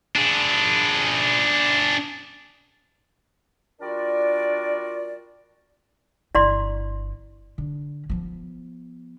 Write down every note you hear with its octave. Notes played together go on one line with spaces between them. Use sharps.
D4 G#4
G3 D4 F4 F#4 A#4 D5
G1 E4 D5 C6
D3
F3 B3